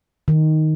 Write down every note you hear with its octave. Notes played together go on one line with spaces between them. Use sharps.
D#3